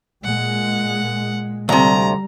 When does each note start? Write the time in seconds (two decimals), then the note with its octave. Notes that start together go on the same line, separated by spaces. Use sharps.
0.24 A#2 G#3 F#5
1.69 D2 C3 G3 A#5